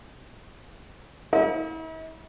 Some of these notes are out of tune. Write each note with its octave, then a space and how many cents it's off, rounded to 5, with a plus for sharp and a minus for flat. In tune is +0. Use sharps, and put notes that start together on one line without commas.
E4 -45